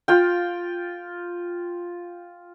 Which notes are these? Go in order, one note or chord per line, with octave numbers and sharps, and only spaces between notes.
F4 G5